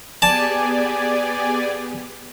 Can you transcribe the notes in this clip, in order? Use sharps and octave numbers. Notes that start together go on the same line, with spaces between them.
B3 G4 G#4 D5 G#5 A5